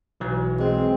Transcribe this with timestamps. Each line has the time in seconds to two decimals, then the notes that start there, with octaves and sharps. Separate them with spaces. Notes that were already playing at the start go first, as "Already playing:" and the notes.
0.20 B1 E3 F#3
0.60 G#3 C4